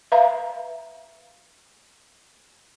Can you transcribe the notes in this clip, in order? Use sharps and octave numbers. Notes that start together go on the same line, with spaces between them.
B4 E5 F5 A#5